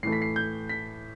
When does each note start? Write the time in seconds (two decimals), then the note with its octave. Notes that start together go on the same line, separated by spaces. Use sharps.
0.03 A2 E3 A3 C7
0.12 B6
0.22 C7
0.36 G6
0.69 B6